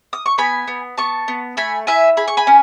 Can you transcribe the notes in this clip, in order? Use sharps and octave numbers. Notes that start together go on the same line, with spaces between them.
D#6
C#6
B3 G#5 B5
B3
B3 A5 C#6
B3
A3 G#5 B5
E4 E5 G#5
G#4 B5
C#6
G#5 B5
C#4